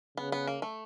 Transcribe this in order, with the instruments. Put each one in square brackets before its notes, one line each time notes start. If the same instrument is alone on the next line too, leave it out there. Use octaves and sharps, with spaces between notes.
[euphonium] C#3 [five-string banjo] B3
[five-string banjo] B3
A#3
A3